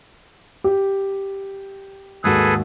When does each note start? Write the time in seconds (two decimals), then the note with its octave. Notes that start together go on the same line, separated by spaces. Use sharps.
0.64 G4
2.24 D#2 G#2 F#4 G#4 A4 B4